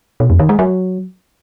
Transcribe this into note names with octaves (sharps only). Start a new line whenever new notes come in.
B2
F2
D#3
G#3
F#3